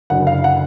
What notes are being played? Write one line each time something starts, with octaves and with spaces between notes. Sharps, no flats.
F#1 F#2 D3 F#3 F#5
F5
F#5